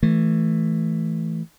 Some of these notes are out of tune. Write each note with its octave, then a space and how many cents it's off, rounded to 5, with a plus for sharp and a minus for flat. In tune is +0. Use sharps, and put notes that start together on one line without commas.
E3 +0 A3 +0